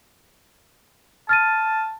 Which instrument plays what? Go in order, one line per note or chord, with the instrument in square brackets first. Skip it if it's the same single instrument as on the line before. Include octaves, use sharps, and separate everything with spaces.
[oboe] A5 [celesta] F6 A6 D#7